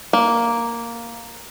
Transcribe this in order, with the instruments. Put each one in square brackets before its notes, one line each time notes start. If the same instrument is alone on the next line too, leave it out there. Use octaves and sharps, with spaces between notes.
[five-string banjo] A#3